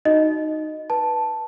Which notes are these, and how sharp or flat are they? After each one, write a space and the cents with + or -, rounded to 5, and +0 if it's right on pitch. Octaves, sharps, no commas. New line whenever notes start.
D#4 +0 F#4 +0 D#5 +0
B4 -10 A5 +0